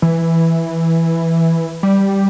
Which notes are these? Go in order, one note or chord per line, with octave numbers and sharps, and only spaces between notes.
E3
G3